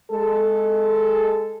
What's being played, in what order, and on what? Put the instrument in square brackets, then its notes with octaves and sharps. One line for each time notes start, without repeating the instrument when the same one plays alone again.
[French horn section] G#3 A4